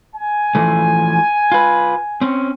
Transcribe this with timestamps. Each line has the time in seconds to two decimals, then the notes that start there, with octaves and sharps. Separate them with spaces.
0.16 G#5
0.55 E3 F3 A3
1.52 F4 B4
2.21 C4 C#4